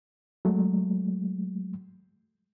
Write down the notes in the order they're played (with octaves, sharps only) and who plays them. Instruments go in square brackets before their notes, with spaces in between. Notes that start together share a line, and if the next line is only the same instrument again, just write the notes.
[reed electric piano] F#3 G#3 A3